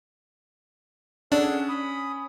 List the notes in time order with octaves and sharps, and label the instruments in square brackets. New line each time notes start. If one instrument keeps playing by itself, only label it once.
[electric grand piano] C#4 [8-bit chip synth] D4 [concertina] G#4 A4 F#5
[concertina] B5 D#6